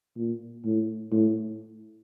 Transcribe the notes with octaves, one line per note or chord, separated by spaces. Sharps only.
A#2
A2
A2